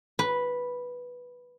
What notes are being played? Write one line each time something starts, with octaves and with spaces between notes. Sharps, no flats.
B4